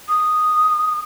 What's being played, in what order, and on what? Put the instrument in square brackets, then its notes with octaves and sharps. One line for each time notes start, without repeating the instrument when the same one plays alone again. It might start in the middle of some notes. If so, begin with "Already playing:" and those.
[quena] D#6